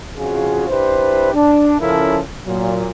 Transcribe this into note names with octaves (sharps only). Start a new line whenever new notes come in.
F2 C#3 F4 F#4 G#4
D4 E4 G4 B4 C5
D4
C#3 F3 C#4 E4 A4 A#4
A#2 F#3